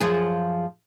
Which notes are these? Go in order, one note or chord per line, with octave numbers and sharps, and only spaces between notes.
F#2 F3 G#4